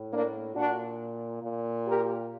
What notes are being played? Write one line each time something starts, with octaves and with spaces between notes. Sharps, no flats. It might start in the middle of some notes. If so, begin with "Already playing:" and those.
Already playing: A2
A#3 D4
A#2 D4 F#4
A#2
G4 A#4